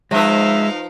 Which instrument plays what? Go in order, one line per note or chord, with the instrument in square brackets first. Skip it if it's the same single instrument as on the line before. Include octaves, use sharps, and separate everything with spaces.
[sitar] F3 B4 [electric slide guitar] G#3 [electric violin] D#4 F5 [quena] E5